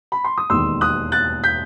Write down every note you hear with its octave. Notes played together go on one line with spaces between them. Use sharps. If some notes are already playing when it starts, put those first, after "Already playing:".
B5
C6
D#6
E1 D#2 D#3 C6 E6
D#6 F#6
F#6 A6
G6 B6